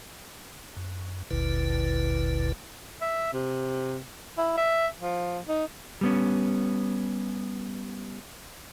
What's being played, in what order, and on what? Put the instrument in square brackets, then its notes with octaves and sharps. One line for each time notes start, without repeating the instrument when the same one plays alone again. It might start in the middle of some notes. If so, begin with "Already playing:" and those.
[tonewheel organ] F#2
G1 D2 A#2 D3 E4 B4
[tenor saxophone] E5
C3
E4
E5
F3
D#4
[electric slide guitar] G3 B3 C#4